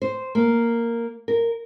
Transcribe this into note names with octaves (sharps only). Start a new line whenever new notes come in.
C5
A#3
A#4